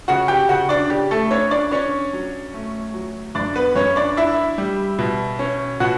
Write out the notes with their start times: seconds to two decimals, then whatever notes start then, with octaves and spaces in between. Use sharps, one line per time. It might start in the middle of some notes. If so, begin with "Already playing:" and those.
0.08 C#3 F#4 F#5
0.28 G4 G5
0.49 C#3 F#4 F#5
0.69 D4 D5
0.90 C#3 G4
1.11 A3 A4
1.31 C#4 D4 C#5
1.51 D4 D5
1.71 C#4 D4 C#5
2.13 F#3
2.54 A3
2.94 F#3
3.35 F#2 D4 D5
3.56 B3 B4
3.76 F#2 C#4 C#5
3.96 D4 D5
4.17 D4 E4 E5
4.58 G3
4.99 B2
5.39 C#4
5.80 B2 F#4 F#5